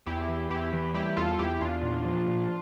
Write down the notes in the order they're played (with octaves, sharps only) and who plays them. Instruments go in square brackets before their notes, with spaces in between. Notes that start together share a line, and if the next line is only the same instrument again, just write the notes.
[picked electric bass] E2 [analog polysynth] E4 G4
[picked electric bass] E3
[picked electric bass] E2 [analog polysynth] E4 G4
[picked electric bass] E3
[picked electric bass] G3 [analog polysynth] E4 G4
[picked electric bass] E2 [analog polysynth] F4 A4
[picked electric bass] E2 [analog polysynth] E4 G4
[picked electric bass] E2 [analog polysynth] D4 F4
[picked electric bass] A#2
F3
A#2